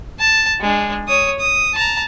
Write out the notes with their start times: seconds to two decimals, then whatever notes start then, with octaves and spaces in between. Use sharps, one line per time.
0.19 A5
0.61 G#3 D4
1.08 C#5 D#6
1.39 D#6
1.74 A5 A#5